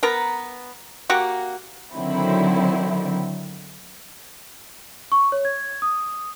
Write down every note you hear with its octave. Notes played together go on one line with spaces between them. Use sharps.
B3 A#4 A#5
A#3 F#4 G4 F#5
D3 D#3 F#3 C4 E4
C#6
C#5
G#6
D#6